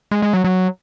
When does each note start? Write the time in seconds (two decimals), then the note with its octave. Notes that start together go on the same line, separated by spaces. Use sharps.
0.11 G#3
0.22 G#3
0.33 F#3
0.44 F#3